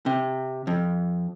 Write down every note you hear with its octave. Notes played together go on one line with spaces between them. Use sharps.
C3
F2